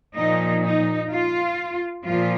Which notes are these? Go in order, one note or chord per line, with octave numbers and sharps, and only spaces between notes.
A#2 F3 D#4
D#4
F4
A#2 F3 F4